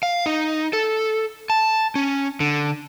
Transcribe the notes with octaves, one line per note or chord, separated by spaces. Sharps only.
F5
D#4
A4
A5
C#4
D3